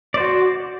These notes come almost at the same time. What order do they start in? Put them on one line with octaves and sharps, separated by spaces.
D5 C5 F#4